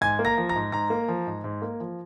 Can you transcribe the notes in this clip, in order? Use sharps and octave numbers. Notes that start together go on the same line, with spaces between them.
G#2 G#5 G#6
A#3
A#5 A#6
F3
A#5 A#6
G#2
G#2 A#5 A#6
A#3
F3
G#2
G#2
A#3
F3